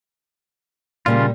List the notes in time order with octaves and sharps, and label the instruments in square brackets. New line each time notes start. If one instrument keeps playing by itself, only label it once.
[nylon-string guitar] A#2 G3 A#3 [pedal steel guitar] C#3 F4